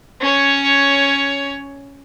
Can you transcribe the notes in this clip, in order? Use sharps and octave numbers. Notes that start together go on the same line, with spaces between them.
C#4 C#5